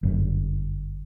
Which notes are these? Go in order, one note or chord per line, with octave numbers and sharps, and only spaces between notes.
G1 F#2